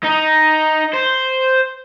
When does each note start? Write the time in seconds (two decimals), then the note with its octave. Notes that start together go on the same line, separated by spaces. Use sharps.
0.04 D#4
0.94 C5